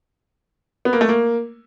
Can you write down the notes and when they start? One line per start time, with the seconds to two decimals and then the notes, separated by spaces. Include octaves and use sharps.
0.85 B3
0.93 A#3
1.01 A3
1.09 A#3